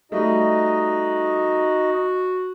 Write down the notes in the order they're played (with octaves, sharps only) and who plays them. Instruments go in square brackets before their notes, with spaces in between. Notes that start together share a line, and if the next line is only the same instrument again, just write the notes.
[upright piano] G3 A3 [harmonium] D#4 D#5 [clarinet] F#4